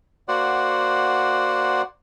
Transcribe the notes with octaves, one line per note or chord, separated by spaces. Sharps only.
A#3 F#4 C5 D5 F#5